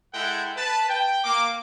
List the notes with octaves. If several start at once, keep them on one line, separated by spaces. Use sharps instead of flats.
G#3 E4 A4 F#5 G5
B4 A5
G5
A#3 D6